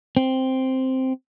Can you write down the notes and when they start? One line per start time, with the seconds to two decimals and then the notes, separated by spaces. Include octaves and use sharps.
0.17 C4